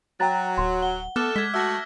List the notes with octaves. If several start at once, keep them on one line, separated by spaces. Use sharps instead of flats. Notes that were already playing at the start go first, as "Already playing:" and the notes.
F#3 G5 A#5 A6
D1 C6
F#5 G7
A3 B3 A4 D6 F6 F#6
G#3 G#6 B6
A3 F#4 E5 E6 A#6 B6